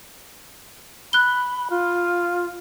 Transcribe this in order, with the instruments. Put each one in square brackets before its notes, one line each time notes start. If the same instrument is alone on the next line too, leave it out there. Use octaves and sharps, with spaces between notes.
[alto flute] B5 [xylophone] F#6 G7
[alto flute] F4